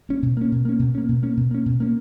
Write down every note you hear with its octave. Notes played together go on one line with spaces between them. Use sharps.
A#3 C#4
B2
A#3 C#4
B2
A#3 C#4
B2
A#3 C#4
B2
A#3 C#4
B2
A#3 C#4
B2
A#3 C#4